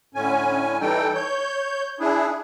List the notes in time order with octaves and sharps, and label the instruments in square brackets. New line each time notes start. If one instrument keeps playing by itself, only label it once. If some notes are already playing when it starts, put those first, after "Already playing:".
[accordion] A2 D3 C#4 G#5
E3 G3 D#4 A4 G5
C#5 G6
D4 E4 G#4